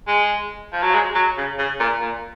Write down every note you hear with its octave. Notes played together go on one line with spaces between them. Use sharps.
G#3
F3
F#3
G#3
F#3
C#3
C#3
A#2
A#2